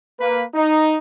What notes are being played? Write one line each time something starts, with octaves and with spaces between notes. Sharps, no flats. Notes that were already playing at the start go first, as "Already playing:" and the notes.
A#3 B4
D#4